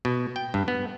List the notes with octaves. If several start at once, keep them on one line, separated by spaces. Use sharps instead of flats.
B2
G5
G2
B3